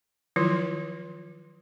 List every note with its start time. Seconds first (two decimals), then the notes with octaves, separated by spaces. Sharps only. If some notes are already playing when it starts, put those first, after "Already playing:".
0.36 D#3 F3 F#3 E4 F4